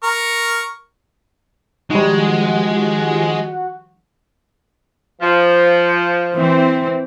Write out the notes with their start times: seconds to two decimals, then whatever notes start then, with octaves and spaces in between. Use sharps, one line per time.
0.04 A#4 C#6
1.90 D#3 F3 G3 G#3 D#4 F#4 G4
5.22 F3
6.35 E3 C4